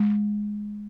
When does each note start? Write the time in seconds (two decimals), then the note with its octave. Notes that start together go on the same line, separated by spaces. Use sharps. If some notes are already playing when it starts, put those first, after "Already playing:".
Already playing: G#3